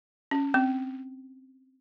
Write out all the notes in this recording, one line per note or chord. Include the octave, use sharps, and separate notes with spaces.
C#4
C4